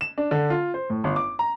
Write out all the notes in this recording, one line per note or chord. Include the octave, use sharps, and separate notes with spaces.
E7
D4
D3
F4
C5
A2
G1
D6
A#5